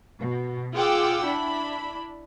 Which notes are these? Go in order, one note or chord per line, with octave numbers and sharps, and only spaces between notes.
B2
F4 G#4 F#5 G5 D6 E6
D4 E4 B5